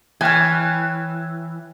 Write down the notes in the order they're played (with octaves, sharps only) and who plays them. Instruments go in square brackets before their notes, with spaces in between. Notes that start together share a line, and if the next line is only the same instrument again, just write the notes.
[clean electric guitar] E3 [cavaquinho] C#5 G#5 [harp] G5 F6